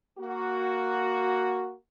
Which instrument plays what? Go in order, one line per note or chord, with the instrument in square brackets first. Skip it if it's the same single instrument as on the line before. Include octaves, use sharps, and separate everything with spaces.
[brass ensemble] A#3 F#4